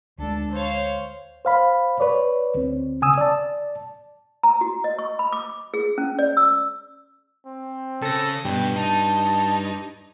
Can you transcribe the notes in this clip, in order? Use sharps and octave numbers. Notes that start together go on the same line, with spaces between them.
D2 G#3 D4 A4
C5 C#5 F5
C5 F5 B5
B4 C#5 D5
D2 C4
C#3 G#5 D#6 E6
D5 A5
A#5
F#4
D#5
C#6
B5
D6
G#4
C#4
D5
E6
C4
C#3 A4 A#6
G2 B2 G5
D#4 A5